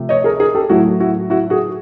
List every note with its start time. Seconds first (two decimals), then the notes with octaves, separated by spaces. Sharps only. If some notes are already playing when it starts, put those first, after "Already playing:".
Already playing: C3 F3 A3
0.09 C#5 D#5
0.24 G#4 A#4
0.40 G#4 A#4
0.54 G4 A4
0.69 A2 F#3 A3 E4 F#4
1.00 E4 F#4
1.30 E4 F#4
1.50 F#4 G#4